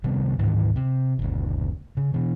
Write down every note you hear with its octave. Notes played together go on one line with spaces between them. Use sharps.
C3 D#3 G3 B3
D2 G#2 D#3 E3
C3
F#1 D2
C#3
B2 E3